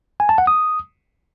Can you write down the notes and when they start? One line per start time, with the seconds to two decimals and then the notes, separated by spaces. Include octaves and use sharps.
0.20 G#5
0.29 A5
0.38 F#5
0.47 D#6